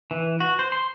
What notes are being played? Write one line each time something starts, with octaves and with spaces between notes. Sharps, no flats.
E3
F#4
C5
C6